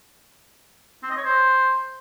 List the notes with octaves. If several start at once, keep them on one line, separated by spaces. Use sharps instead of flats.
C4
D#5
C#5
C5